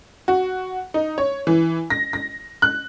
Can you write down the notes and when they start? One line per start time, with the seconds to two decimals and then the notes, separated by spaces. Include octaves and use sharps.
0.28 F#4
0.94 D#4
1.18 C#5
1.47 E3
1.90 A#6
2.13 A#6
2.62 F#6